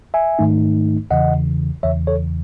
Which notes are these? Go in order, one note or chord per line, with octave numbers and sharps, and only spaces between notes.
E5 G#5
G#2 D#3 A3 D#4
E2 C#3 E3 D#5 F#5
E2 C#3 E3 C#5 E5
A4 C#5